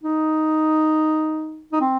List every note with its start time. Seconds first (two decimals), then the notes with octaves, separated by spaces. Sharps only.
0.03 D#4
1.72 D#4
1.81 C4